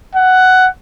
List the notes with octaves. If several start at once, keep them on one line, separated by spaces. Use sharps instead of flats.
F#5